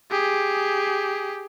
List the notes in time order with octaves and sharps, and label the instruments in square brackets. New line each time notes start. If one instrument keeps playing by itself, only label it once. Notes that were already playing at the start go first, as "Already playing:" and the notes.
[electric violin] G4 G#4